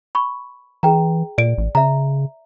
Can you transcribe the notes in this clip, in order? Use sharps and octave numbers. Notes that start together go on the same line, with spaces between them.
B5 C#6
E3 G#4 G5 A#5
A#2 D5 D7
A1
C#3 E5 A#5